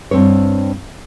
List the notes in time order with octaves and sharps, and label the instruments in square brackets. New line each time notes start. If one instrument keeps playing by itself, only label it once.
[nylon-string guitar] G2 C4 C#5